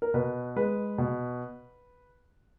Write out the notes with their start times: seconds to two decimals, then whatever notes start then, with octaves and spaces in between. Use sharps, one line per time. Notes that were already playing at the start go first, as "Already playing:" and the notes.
0.02 A#4
0.14 B2 B4
0.56 G#3 B4
0.98 B2